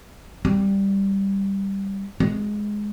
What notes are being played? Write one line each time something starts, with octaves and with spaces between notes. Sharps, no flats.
G3
G#3